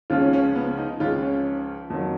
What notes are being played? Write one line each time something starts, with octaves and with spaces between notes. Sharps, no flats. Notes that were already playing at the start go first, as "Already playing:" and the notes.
C#2 C#3 F3 F4
C#4
C#4
B3
D#4
C#2 C#3 F3 F4
C#4
F2 D#3 F#3